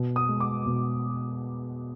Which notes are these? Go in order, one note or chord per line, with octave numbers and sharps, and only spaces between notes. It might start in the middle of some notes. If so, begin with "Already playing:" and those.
Already playing: B2
D#6
G#3
D6
B2